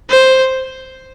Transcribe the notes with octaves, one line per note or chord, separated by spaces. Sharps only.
C5